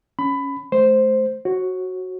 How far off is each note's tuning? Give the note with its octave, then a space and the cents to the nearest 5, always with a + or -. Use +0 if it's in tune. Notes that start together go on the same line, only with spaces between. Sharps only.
C#4 +0 B5 +20
A3 -30 C5 +0
F#4 +0 C#5 -40